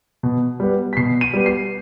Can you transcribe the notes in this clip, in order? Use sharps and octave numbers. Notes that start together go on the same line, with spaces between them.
B2
G3 B3
B6
B2 C7
D#7
G3 B3
C7